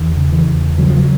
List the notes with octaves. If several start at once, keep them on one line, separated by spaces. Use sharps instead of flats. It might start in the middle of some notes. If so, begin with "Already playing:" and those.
Already playing: E2 D#3
C#3
E3
E2
C#3 F#3
F3
F#3